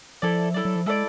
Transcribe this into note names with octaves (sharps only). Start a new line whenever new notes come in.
F3 E4 A4 D5
F#3 E4 A4 D5
F#3
F3
G#3 E4 A4 D5